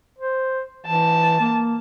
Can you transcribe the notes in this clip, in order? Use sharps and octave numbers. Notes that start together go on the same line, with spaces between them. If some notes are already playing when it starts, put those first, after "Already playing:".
C5
E3 A5
A#3